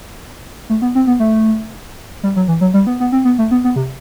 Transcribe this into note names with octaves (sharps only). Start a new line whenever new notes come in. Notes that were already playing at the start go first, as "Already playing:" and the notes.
A3
B3
C4
B3
A3
G3
F#3
E3
F#3
G3
B3
B3
C4
B3
A3
B3
B3
C3